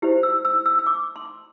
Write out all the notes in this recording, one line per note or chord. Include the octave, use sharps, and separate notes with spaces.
E4 G4 C5
E6
E6
E6
E6
D6
C6